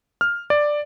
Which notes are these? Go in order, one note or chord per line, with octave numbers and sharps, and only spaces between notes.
F6
D5